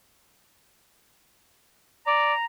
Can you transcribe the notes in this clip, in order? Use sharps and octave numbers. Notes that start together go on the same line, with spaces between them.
D5 A#5